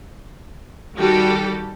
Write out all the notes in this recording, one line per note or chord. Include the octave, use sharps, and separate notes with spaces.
D#3 G3 F#4 G4 A4